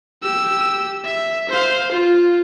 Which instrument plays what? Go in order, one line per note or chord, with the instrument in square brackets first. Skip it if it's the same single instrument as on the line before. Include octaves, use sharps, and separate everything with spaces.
[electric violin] G4 E6
E5
C5 F5
F4